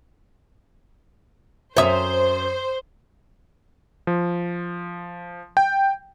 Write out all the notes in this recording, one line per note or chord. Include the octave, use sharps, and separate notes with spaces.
F#2 C5 C#5 E5 D#6
F3
G5